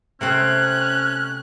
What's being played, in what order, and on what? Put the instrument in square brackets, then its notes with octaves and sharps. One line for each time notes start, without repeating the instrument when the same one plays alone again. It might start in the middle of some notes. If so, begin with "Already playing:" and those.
[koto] C3 A3 C4 [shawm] C#4 [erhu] F#6